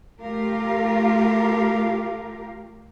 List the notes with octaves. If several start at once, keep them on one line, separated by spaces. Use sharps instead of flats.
A3 F4 G4 A#4 F5